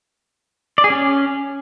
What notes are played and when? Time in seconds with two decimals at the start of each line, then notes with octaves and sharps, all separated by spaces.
0.78 D5
0.84 G#4
0.90 C#4